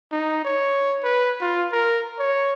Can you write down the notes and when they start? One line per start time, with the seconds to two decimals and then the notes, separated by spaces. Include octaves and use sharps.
0.12 D#4
0.45 C#5
1.04 B4
1.41 F4
1.72 A#4
2.19 C#5